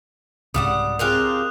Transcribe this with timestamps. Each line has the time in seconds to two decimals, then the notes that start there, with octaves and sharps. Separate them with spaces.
0.54 C2 G#2 C#3 G3 F5 F#5 D#6 E7
0.99 C4 D#4 F4 G4 G#4 A#4 F#6 F7